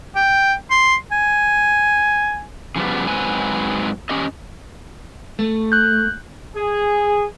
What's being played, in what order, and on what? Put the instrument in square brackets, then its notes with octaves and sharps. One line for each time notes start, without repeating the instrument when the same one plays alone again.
[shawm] G5
C6
G#5
[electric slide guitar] C#3 F3 G3 B3
G#2 F#3 C4 B4 G#5
C#4 G4 D#5
[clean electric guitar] A3
[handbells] F#6 G6
[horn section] G#4